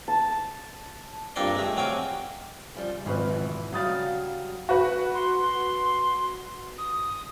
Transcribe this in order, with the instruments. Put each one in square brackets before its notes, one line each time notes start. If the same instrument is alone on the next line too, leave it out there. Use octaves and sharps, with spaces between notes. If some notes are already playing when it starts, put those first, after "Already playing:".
[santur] A5
[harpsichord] G2 A#2 C4 D4 D5 C6
G#3 A3
F#3 C4 F5 G#5 D6
[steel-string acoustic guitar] C#3 F3 G3
[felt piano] G#1 B4 [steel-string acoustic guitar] C#3 F3
[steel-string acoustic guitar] B2 E3
[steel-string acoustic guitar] C#3 G3 F5 [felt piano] F#3 D#6 A6
[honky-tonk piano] F#4 B4
[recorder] C6
D#6